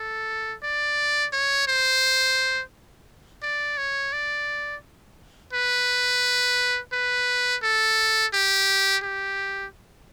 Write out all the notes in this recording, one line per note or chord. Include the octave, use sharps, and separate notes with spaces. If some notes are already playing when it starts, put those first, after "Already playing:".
Already playing: A4
D5
C#5
C5
D5
C#5
D5
B4
B4
A4
G4
G4